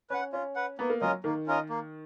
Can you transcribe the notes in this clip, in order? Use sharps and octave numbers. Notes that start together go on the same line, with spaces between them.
C#4 B4 F#5
C#4 F4
B4 F#5
A#3 B3
A#3
F#3 C#4 F4 A#4 D#5
D#3 A#3
C#4 F4 A#4 D#5
A#3